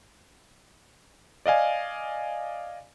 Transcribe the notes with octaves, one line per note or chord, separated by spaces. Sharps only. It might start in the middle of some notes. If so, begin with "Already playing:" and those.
D5 D#5 F5 G#5